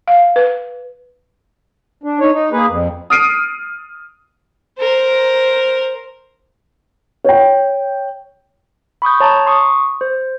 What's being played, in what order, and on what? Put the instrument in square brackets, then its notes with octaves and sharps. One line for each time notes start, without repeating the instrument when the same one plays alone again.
[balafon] F5
B4
[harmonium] D4
D#4 C#5
D#4
A#3 G#4 B4
F2
[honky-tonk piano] D#6 F6 C7 D7 D#7
[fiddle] A#4 C5
[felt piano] C#5 G5
[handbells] B5 C#6 D#6 G6
C#5 A5 A#5
C6 C#6 D#6
C5